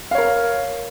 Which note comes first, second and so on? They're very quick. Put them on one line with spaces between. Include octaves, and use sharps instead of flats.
F5 C#5 A#4